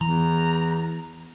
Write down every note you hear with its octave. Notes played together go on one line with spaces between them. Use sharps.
E2 E3 A#5